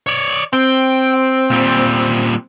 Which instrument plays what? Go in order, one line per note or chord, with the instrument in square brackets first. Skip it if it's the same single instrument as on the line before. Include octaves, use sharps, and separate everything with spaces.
[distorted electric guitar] C#5 D5
[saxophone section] C4 [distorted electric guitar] G5
[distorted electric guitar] A#2 G3